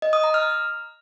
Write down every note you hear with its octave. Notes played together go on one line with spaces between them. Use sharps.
D#5
D#6
A#5
F6